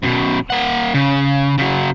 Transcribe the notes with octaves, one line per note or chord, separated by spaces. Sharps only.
F#2 B2
A#3 F#5
C#3
C#3 F#3